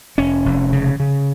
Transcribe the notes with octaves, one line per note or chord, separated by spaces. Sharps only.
F1 C#4
F1
C#3
C#3